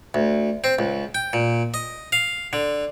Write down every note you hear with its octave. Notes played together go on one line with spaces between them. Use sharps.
D2
C4
C#2
G5
A#2
D#5
F5
D3